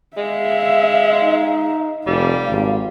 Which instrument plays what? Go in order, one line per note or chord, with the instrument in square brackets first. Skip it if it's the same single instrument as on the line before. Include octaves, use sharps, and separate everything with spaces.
[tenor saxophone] G#3 [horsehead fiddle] E5 F5
[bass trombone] D#4
[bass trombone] F1 [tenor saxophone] G3 [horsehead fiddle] F5
[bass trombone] G#1